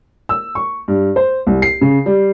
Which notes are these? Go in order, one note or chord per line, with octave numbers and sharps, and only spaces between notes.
E6
C#6
G2
C5
C2
C7
C#3
G3